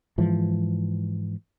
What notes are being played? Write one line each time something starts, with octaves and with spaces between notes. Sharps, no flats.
G#2 E3 F3